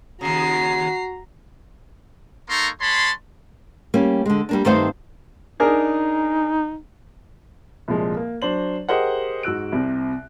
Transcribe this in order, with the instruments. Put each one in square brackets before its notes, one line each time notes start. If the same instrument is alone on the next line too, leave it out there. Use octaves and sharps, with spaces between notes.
[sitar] D#2 C#3 [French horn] F#4 [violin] A#5 C7
[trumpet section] A#3 D#4 A4 A#5 C6 C#6
G#3 C#5 A5 B5 C6
[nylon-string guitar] G3 A#3 C#4
D3 G#3
G3 A#3 D4
G2 D#3 A3 C4 C5 F5
[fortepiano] D4 G#4 A#4 [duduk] D#4
[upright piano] C2 A#2 F3 G#3
A#3
F#3 D4 C5 F#7
G4 G#4 A#4 C5 D#5 F#5
G#2 F#4 E6 F#6 D7
C2 C3